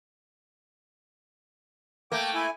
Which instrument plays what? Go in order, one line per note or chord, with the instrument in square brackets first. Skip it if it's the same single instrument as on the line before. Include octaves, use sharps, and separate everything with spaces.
[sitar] A3 A#3 [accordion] G5 D6
[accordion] E4 G#5